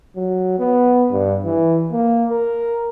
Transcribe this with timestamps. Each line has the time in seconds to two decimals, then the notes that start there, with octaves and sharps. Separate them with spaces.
0.16 F#3
0.59 B3
1.11 G2
1.45 E3
1.92 A#3
2.30 A#4